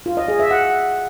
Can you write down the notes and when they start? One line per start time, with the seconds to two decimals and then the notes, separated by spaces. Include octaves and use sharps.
0.06 F4
0.17 D#5
0.28 G#4
0.40 E5
0.51 F#5